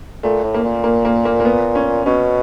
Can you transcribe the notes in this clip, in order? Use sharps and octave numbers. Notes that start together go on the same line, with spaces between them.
A#2 A3
A2
A#3
A#2
A#3
A#3
A#3
A#3
B3
C#4
B2 C#4